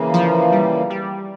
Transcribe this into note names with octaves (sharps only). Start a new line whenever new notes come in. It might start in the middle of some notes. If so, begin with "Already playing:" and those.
Already playing: C#3 E3 A#3
F3
G3
G3